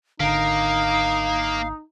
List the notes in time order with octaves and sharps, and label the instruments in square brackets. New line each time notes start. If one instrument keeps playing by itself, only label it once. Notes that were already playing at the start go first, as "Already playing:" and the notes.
[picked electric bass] G#1 D3 [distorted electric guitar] A#3 [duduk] D#4 [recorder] F5